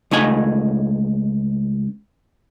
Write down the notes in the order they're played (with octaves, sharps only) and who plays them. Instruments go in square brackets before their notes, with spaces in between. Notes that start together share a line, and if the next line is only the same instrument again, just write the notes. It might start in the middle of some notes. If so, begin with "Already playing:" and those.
[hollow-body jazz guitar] C#2 A3 D#4 G#5